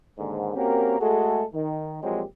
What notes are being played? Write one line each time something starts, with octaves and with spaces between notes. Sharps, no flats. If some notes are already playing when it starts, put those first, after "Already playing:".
D#2 G#2 D3
A#3 C4 C#4 F#4 G4 A#4
G#3 A3 F#4 G#4 A4
D#3
A#2 F3 F#3 G#3 C4 G4